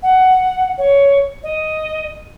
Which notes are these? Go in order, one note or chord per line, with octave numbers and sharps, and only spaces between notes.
F#5
C#5
D#5